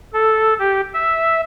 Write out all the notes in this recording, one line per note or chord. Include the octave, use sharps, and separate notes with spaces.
A4
G4
E5